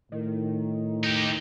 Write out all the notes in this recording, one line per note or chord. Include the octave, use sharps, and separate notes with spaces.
A2 D#3
D#4 G4